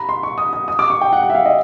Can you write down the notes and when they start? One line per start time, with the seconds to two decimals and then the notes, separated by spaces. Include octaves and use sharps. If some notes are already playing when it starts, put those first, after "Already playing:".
Already playing: A#5 B5
0.09 C6
0.23 C#6
0.38 D#6
0.53 D#6
0.68 D#6
0.79 D6
0.90 C#6
1.01 G5
1.13 F#5
1.23 F#5
1.30 E5
1.35 F5
1.46 D#5